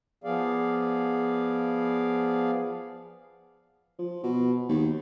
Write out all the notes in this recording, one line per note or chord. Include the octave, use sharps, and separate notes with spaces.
F3 B3 G#4 D5 F5
F3
B2
D#2